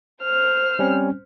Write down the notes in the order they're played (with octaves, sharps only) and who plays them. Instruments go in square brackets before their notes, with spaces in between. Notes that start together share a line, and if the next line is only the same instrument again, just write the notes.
[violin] C5 F6
[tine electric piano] G3 C4 C#4